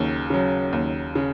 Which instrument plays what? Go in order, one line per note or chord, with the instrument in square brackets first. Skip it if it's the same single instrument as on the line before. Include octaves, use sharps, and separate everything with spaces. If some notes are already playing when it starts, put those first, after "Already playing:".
Already playing: [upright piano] D#2 C#3 F#3
C#3 F#3
D#2
C#3